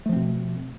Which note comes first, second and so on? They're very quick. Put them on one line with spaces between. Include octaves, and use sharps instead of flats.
A3 F3 C4 B2